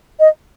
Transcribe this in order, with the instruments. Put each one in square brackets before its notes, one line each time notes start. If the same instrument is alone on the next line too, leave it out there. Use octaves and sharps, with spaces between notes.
[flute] D#5